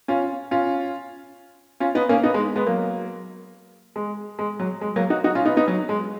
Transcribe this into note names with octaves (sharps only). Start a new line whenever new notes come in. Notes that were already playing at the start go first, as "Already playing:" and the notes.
C#4 F4
C#4 F4
C#4 F4
B3 D#4
A#3 C#4
B3 D#4
G#3
G#3 B3
F#3 A#3
G#3
G#3
F#3
G#3
F#3 A#3
D#4 F#4
D#4 F#4
C#4 F4
B3 D#4
B3 D#4
F#3
G#3